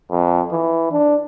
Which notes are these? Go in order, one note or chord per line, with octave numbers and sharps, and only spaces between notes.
F2
E3
D4